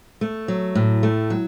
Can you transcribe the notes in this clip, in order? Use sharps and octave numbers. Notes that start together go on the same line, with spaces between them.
A3
F#3
A2
A3
F#3